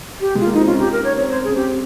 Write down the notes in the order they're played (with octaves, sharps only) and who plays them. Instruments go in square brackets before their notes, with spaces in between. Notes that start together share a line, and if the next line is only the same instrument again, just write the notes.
[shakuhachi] G4
[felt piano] G#3 [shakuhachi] F4
[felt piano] A#3
[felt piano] C4 [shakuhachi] D#4
[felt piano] C#4 [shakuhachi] F4
[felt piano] D#4 [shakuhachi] G4
[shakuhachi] A#4
C#5
[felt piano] C4 [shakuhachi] C#5
[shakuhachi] C5
[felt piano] C#4 [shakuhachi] G#4
[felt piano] C4 [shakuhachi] G4